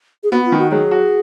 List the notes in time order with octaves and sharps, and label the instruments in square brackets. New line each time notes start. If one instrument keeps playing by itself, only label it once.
[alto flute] G#4
[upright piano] B3 [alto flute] F#4
[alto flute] F4
[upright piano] D#3
[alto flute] F#4
[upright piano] F#3 [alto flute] G#4
[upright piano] F#4